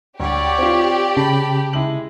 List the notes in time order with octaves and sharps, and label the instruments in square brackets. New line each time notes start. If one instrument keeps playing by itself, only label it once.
[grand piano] D2 [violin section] G4 [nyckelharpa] C#5 D5
[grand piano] C4 F4
[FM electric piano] C#3 [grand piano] A5 [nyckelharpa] B5
[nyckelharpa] G#3 [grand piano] E4 F#7